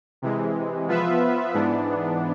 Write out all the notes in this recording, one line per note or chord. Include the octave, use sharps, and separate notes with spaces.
C3 E3 G#3
F3 B3 F4 B4 E5
G#2 E3 B3 D4